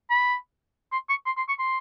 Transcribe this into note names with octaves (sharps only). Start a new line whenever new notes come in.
B5
C6
C#6
C6
C6
C#6
C6